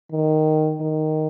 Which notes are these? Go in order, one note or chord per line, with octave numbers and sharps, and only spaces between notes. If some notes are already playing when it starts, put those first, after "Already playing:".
D#3
D#3